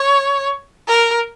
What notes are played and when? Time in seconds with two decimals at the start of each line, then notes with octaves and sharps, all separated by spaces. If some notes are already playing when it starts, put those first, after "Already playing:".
Already playing: C#5
0.88 A#4